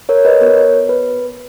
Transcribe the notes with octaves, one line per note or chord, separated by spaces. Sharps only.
A#4 C#5
B4 D#5
B3 F#4 A#4 C#5
B4